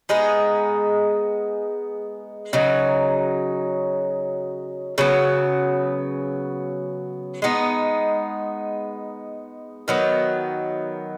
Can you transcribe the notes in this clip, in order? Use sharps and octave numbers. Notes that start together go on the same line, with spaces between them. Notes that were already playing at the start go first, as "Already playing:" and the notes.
G#3 B3 D#4 G#4
C#3 F#3 D#4
C#3 F#3 B3
G#3 B3 D#4
D#3 F#3 B3